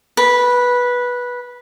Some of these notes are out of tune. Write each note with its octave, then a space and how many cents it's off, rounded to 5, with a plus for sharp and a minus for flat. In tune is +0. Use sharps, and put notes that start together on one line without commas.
B4 -10